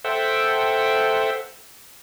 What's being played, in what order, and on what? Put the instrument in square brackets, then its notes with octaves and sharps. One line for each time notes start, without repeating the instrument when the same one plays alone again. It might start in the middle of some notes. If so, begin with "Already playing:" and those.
[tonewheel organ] A4 C5 E5 F#5 G5